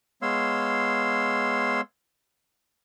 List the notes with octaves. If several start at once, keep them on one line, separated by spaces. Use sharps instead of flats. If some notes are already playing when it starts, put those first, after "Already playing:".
G#3 B3 C#5 F5 C6 E6